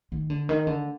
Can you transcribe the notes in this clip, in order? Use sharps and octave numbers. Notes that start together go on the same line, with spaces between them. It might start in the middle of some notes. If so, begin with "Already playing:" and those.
D#3
D3
D#3
D3